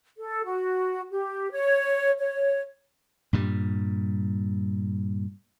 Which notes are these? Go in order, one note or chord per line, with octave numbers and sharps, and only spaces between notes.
A4
F#4
G4
C#5
C#5
G2 A#2 G3